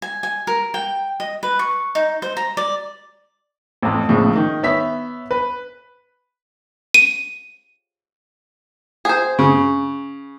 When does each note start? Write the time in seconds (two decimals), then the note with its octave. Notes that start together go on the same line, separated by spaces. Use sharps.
0.02 G#5
0.23 G#5
0.47 A#4
0.74 G5
1.20 D#5
1.43 B4
1.59 C#6
1.95 D#4
2.22 C5
2.37 A#5
2.57 D5
3.83 A1 F2
4.09 A#1 A2 C#3 F3
4.35 D#3
4.63 B3 C#5 E5 B6
5.31 B4
6.94 D#7
9.05 G#4 C5
9.39 C#3